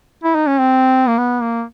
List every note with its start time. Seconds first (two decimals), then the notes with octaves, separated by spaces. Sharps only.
0.24 E4
0.35 D#4
0.47 C#4
0.59 C4
1.08 A#3
1.18 B3
1.42 A#3